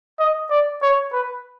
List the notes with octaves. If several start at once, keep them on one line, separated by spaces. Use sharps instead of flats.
D#5
D5
C#5
B4